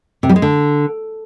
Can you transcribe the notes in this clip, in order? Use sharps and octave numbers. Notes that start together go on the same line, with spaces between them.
C3
G3
G#3
D3